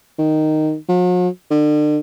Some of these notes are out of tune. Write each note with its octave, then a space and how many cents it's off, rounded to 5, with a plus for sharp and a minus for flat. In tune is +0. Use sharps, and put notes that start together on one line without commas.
D#3 -5
F#3 -45
D3 +40